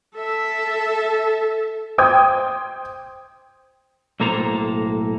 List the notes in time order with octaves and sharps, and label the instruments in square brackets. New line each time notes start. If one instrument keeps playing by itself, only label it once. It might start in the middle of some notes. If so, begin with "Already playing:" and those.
[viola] A4 E5
[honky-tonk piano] C5 G5 D#6 G6 G#6
[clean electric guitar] B1 A2 A#3 A4 C5 A#5